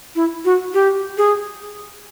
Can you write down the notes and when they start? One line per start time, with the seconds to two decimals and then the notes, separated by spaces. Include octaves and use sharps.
0.16 E4
0.45 F#4
0.74 G4
1.18 G#4